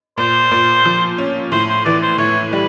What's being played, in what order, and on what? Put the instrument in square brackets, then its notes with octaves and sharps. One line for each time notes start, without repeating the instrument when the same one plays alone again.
[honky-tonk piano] A#2 [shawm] C5
[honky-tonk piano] A#2
F3
C#4
[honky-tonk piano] A2 [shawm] C5
[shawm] C5
[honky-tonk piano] E3 [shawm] D5
[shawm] C5
[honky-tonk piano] A2 [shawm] C#5
[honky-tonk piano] G3 [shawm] B4